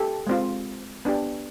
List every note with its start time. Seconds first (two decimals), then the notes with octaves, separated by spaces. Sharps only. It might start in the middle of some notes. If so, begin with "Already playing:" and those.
Already playing: G4 A4
0.27 G#3 C4 F4
1.05 B3 D4 G4